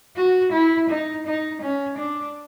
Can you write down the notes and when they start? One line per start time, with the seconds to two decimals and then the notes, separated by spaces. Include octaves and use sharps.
0.17 F#4
0.52 E4
0.89 D#4
1.26 D#4
1.62 C#4
1.98 D4